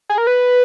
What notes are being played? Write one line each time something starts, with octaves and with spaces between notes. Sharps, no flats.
G#4
A#4
B4